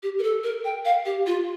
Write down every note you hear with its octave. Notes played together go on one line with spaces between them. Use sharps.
G4
A#4
A4
A#4
G5
F5
G4
F4